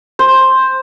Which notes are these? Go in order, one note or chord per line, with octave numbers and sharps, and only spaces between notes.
C5